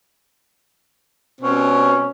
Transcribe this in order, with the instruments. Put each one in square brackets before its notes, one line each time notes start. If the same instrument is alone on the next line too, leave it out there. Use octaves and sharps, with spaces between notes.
[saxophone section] B2 G3 C4 C#4